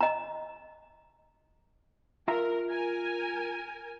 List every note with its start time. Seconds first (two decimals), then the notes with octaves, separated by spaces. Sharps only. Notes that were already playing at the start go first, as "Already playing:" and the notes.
0.01 D#5 A#5
2.28 F4 A#4 E5 A#5
2.68 A#4 G#5